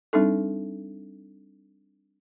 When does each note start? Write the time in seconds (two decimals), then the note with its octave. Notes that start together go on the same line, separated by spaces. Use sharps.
0.13 G3 C4 D4 D#4 A4